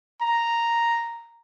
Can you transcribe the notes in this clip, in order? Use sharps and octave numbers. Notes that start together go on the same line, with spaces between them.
A#5